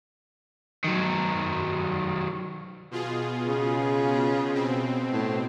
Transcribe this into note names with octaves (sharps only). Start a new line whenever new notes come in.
D#3 F#3
B2 F4 G#4
C#3
B2 C4
A2